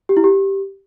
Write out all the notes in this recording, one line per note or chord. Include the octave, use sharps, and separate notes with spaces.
G4
E4
G4